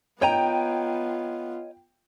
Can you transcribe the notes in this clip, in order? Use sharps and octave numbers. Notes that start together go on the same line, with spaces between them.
B3 F4 C#5 D#5 G5 A#5